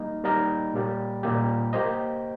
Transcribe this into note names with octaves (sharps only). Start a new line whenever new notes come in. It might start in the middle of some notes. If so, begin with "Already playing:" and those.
Already playing: G3 A#3 D#4 A#4 D#5
G3 A#3 D#4 A#4 D#5
A#2 G3 A#3 G4
A#2 G3 A#3 G4
A#3 G4 C5 D#5